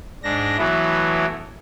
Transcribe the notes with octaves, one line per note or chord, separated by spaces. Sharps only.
G#2 D4 A#6
E3 F#3 A3 B3 E4